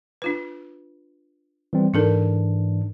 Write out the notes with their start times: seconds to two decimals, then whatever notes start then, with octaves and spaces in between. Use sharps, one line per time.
0.22 D4 F4 B4
1.73 E3 G3 C4
1.94 G#2 E3 D4 D#4 A4 A#4